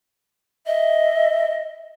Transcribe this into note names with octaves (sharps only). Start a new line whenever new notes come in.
D#5 E5